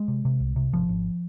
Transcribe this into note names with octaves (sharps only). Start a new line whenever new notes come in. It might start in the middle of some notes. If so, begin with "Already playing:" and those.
Already playing: G#3
C3
C3
C2
C3
G#1 F3
G#1